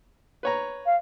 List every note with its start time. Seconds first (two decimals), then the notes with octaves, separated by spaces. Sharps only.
0.43 B4 C#5 A#5
0.86 F5